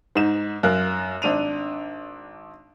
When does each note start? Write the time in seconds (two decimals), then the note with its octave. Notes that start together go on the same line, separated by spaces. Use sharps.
0.15 G#2 D#4 E7
0.63 F#2 A#4 F5 F#6
1.22 G#1 D4 D#7 F7